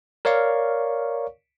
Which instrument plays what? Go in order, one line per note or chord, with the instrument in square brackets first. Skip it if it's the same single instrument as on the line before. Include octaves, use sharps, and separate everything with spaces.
[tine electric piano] A#4 C#5 D5 F5 C#6